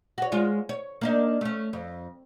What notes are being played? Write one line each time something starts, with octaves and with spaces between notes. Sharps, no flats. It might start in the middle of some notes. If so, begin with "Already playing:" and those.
F#4 C#5
G#3 F4 C#5
C#5
A#3 D4 D#4
A3 C#4
F2